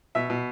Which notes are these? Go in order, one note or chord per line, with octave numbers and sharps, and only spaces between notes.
B2 E5
B2